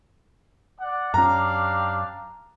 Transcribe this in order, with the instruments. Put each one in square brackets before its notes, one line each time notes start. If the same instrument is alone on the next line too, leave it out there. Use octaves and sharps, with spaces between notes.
[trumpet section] D5 F#5
[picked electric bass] F#2 C#4 [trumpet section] D4 G4 F5 [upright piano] A#5